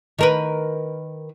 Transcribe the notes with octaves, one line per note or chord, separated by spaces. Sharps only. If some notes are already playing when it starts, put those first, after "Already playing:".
D#3 A#4 B4